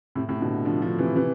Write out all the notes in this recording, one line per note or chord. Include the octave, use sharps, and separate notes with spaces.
A2 C3
A2 C3
B2 D3
D3 F3
D3 F3
C3 E3
C3 E3